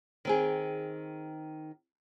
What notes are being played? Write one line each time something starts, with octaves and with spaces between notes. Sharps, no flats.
D#3 C4 G#4